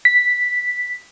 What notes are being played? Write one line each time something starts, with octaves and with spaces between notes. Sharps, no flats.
B6